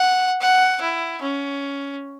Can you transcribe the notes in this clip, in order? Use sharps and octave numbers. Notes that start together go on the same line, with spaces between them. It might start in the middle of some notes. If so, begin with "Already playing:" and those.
Already playing: F#5
F#5
E4
C#4